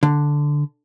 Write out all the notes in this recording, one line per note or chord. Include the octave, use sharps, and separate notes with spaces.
D3